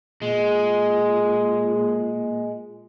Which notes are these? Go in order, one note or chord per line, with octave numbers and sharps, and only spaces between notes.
A#2 G#3